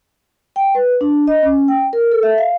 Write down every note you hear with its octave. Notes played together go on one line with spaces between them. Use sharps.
G5
B4
D4
D#5
C#4
G5
A#4
A4
E5
F5